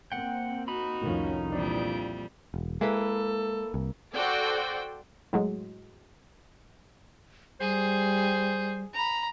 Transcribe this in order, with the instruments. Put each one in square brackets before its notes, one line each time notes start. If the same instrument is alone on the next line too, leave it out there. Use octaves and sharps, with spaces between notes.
[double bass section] A#3 C4 [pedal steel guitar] F#5 G5
[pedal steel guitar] D#4 B5 [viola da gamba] F#4
[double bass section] C2 F2 C#4 [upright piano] A2 D#3 F3
[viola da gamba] F2 A#2 G3 [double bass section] E3 [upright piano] D4
[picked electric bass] E1
[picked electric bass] G#3 [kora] A#3 E4 B4 [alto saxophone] A4
[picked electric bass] C2
[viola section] F#4 A4 C5 D5 G5
[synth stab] A2 F#3 G#3
[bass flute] G3 [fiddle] G#4 [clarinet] C5
[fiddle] A#5 B5